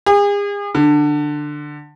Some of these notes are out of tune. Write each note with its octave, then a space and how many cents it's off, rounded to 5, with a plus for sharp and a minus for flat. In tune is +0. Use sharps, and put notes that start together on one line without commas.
G#4 -40
D3 +15